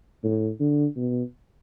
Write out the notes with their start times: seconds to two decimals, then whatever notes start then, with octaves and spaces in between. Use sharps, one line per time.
0.24 A2
0.60 D3
0.96 B2